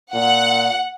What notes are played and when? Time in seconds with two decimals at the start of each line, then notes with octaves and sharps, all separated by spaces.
0.14 A#2 F#5